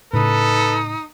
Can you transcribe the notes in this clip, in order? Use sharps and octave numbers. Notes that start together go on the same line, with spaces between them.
A2 C#3 D#4 A4 B4